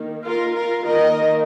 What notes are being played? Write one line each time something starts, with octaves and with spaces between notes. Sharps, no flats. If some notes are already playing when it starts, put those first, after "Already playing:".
Already playing: D#3 A#3
F4 A#4
F4 A#4
D#3 A#3 A#4 D#5